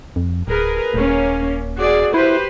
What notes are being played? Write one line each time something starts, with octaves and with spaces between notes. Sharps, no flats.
F2
D1 G#4 A#4 B4
D#1 A#3 C#4
F#4 G#4 D5
E4 G4 B4 C5